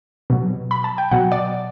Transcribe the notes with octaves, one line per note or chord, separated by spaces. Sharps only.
B2 F#3
B5
A5
G5
B2 F#3 F#5
D5